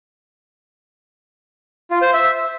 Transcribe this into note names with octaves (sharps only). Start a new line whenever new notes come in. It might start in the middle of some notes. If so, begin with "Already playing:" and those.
F4
C5
E5